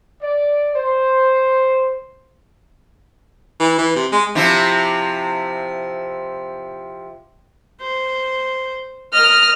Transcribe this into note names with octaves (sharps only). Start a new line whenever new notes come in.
D5
C5
E3
E3
C3
G#3
C3 F3 E4
C5
A#4 D#5 F6